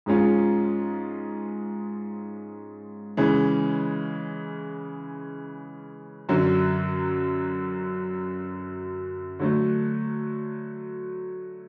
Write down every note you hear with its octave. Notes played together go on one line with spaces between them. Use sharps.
G#2 F3 G#3 C#4 F4
C#3 E3 G#3 C#4
F#2 D3 F#3
D3 F#3 A3